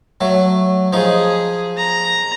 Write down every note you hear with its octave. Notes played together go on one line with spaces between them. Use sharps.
F#3 A3
F3 D#4 G#4
A#5